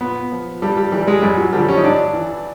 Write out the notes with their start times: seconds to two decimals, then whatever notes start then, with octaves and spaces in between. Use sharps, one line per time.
0.01 A#2 B3
0.32 F3
0.62 G2 G3
0.77 G3
0.92 E3 G3
1.07 G#3
1.22 F#2 G3
1.37 F#3
1.53 D3 F3 G3
1.69 C#4
1.77 D#4
1.84 G2 D4
2.13 E3